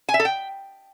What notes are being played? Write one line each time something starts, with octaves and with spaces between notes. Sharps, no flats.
G#5
E5
A4
G5